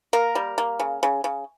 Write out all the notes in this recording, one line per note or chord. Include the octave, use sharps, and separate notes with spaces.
A#3 A#4
G3
A#3
C#3
C#3
C#3